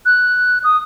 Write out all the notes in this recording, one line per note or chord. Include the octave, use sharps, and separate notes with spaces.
F#6
D#6